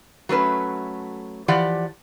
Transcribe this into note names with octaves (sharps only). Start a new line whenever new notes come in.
F#3 A3 C#4 B4
E3 F3 G4 D5 F#5